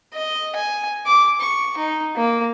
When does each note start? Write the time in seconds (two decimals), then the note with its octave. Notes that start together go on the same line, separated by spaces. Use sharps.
0.14 D#5
0.56 G#5
1.06 D6
1.40 C#6
1.77 D#4
2.16 A#3